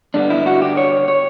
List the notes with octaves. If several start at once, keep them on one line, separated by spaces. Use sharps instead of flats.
G2 D3 G3 B3 D4
E4
F#4
G4
C#5
C#5